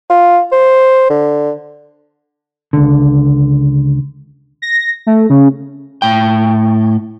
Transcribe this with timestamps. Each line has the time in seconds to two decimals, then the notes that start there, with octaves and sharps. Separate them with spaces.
0.10 F4
0.52 C5
1.10 D3
2.73 C#2 D3
4.62 A#6
5.07 A3
5.30 C#3
6.02 A2 G5